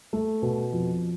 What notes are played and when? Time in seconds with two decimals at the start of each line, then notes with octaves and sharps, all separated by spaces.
0.13 A3
0.42 B2
0.73 F2